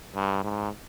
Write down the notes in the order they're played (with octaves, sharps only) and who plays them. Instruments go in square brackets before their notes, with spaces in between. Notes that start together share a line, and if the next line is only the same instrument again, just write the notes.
[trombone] G2
G#2